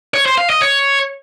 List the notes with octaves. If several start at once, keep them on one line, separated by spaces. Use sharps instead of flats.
C#5
C5
F5
D#5
C#5